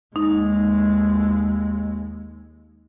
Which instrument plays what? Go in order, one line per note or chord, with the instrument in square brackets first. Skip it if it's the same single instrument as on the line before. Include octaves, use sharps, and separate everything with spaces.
[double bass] D#2 G#3 [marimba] D#4